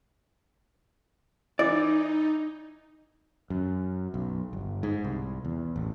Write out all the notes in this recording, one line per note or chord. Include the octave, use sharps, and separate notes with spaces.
E3 D#4 D5
F#2
B1
G1
G#2
C2
E2
A1